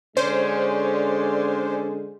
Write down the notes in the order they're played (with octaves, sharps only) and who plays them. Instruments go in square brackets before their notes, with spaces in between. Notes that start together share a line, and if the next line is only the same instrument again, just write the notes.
[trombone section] D3 G#3 [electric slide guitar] C#4 [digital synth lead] C5 [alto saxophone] D5